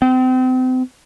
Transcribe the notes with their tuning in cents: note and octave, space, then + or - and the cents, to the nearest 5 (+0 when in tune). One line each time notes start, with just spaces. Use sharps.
C4 -35